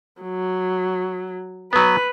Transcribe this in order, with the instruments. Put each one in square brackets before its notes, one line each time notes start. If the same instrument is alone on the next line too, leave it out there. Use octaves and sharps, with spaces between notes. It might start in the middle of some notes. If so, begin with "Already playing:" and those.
[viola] F#3
[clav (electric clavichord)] F#3 B3 [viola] B4